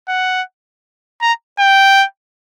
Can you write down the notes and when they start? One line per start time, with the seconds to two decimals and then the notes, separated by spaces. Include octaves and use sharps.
0.08 F#5
1.21 A#5
1.59 G5